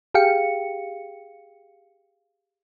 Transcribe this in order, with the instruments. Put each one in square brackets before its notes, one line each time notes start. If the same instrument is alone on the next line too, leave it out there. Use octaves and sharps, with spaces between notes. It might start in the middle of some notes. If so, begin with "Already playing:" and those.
[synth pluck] G4 G#4 F5 G5 C#7